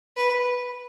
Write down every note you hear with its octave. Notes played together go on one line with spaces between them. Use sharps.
B4